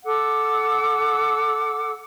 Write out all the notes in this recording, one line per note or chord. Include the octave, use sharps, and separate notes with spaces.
A4 F#5 D6 E6